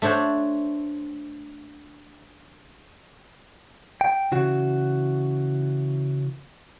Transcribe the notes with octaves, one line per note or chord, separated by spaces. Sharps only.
A3 D4 C5 C#5 F#5
G5
C#3 E3 F#4